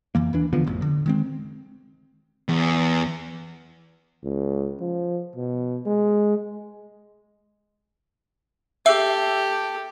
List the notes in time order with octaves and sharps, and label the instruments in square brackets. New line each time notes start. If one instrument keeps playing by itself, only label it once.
[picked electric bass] F2 E3 A#3
D#2 E3 D4
D3 E3 F3 B3
D#1 A1 F2
D3
D#3 G#3 C4
[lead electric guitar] E2
[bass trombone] C#2
F3
B2
G#3
[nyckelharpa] G4 A4 [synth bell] E5 E6